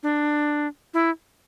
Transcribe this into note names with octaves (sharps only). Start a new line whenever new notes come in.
D4
E4